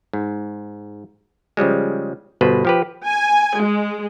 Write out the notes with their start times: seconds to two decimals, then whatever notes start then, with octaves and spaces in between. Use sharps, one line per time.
0.13 G#2
1.57 C#3 F3 G3 G#3
2.41 G1 B2 B4 C5
2.65 F3 G4 B4
3.07 G#5
3.60 G#3